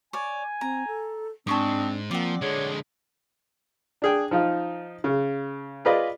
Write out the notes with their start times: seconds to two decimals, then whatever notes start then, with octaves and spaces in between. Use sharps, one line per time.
0.13 C#5 D5 G#5
0.61 C4 A#5
0.87 A4
1.47 G#2 C4 D4 A5 C#6 D#6
2.11 F3 A#3 C4 D5 F#5
2.41 D3 G#3 G#4 C#5
4.02 D4 G#4 G5
4.31 F3 D#4 F4
5.04 C#3
5.85 F4 G#4 B4 D5 D#5